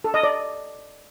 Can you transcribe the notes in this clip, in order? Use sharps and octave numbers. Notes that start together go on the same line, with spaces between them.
A4
D#5
D5